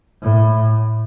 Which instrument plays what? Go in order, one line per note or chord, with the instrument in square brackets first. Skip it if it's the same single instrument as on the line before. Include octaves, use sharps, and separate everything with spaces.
[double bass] A2